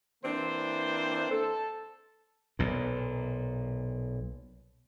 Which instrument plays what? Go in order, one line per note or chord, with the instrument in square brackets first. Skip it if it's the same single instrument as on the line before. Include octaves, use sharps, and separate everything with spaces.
[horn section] E3 A#3 C4 D4 C5
A4
[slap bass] B1 A#2